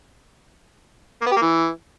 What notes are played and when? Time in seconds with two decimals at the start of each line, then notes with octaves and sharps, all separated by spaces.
1.21 A#3
1.26 B3
1.31 G4
1.36 A#3
1.42 E3